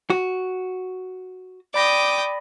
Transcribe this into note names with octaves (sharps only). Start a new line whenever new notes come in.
F#4
D5 G5 B5 D6 D#6 A#6